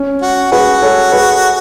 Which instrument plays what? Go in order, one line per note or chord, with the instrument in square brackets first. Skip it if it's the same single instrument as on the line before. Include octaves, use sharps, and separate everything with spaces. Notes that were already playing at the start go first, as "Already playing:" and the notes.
Already playing: [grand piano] C#4
[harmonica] F#4
[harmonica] F#4 [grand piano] G#4 B4
[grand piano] A4 C#5
G#4 B4